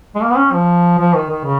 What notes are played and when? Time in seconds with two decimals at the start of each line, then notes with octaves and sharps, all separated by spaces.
0.15 G#3
0.22 A#3
0.30 B3
0.36 C#4
0.52 F3
0.99 F3
1.14 D#3
1.29 D#3
1.44 C#3